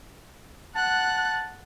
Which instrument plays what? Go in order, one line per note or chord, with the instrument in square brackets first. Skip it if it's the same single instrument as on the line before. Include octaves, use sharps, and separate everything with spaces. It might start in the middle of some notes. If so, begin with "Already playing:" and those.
[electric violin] F#5 F#6 [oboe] A5